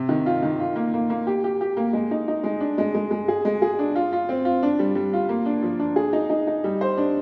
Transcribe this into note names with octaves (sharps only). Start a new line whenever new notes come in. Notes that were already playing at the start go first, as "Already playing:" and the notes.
Already playing: C3
D#3
F4
D#3
F4
A#3
A#3
A#3
G4
G4
G4
A#3
G#3
D#4
D#4
G#3
D4
G#3
G#3
G#3
G#4
G#3
G#4
D4
F4
F4
C4
F4
D4
G3
G3
F4
A#3
D4
F3
D4
G#4
D#4
D#4
D#4
G3
C5
D4